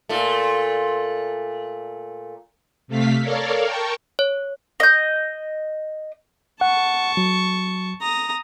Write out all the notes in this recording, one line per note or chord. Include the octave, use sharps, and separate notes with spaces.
A#2 A3
C3 A3 F5 B6
A4 A#4 C#5 D5 F5
A#4 G5 A5 C#6
C#5
D#5 G6
F#5 A5 C#6
F#3
A#5 D#6